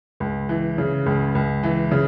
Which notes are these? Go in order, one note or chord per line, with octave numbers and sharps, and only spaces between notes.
C#2
E3
C#3
C#2
C#2
E3
C#3